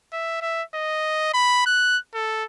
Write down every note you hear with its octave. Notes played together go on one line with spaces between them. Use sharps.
E5
E5
D#5
B5
F#6
A4